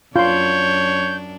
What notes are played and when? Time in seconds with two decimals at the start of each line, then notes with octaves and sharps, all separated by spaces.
0.16 F#2 D4 F4 C#5 C6 G6